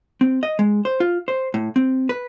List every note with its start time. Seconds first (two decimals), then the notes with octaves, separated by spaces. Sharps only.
0.21 C4
0.43 D#5
0.59 G#3
0.85 C5
1.00 F4
1.28 C5
1.54 A2
1.76 C4
2.09 B4